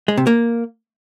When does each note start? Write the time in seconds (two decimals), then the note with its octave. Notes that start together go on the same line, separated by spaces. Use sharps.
0.08 G#3
0.17 C3
0.27 A#3